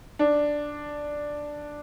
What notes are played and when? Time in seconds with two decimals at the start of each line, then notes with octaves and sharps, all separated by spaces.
0.19 D4